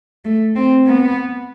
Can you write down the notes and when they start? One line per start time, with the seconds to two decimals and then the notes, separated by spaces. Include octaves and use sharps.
0.25 A3
0.56 C4
0.87 B3